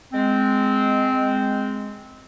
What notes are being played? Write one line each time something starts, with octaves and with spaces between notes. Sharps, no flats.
G#3 C4